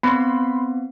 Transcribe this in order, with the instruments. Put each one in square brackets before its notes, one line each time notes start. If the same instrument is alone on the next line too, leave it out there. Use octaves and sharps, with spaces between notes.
[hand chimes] B3 C4 [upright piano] B5 C6